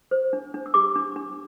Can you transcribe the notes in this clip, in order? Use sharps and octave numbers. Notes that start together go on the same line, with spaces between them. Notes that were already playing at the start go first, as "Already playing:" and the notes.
C5
D4
D4
E6
G4 D6
D4
D4